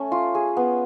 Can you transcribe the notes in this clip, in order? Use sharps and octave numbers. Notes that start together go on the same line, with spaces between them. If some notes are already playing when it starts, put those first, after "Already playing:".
Already playing: A3 C#4
F4
G#4
B3